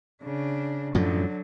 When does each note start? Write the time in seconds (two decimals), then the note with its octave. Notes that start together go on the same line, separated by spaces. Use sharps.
0.23 C#3 D4
0.95 F#2 A2 D3 F3 F#3